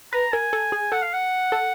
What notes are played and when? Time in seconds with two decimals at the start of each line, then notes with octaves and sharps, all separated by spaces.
0.13 B4 A#5
0.32 A#4 G#5
0.53 A4
0.72 G#4
0.92 A4 F#5
1.02 F5
1.13 F#5
1.52 A4